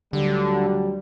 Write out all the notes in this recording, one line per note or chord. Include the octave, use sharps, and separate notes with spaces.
D2 D3 F#3 G3